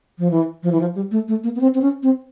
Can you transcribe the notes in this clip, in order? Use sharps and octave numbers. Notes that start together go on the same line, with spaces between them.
F3
E3
F3
E3
F3
G3
A3
A3
A#3
B3
C4
C4
C#4
C4